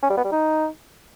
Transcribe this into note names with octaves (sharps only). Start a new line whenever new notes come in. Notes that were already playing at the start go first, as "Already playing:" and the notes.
C#4
G3
B3
G3
D#4